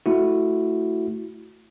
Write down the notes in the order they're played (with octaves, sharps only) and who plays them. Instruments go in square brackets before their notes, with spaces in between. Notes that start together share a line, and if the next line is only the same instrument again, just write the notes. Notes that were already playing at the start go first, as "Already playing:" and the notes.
[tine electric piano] A3 E4 F#4